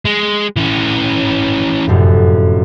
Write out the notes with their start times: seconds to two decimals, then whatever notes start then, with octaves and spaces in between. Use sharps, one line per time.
0.05 G#3
0.56 E3 C#4
1.87 F1 F#2 A2